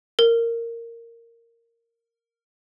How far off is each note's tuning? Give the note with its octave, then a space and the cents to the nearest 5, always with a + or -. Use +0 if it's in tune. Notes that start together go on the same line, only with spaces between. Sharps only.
A#4 -10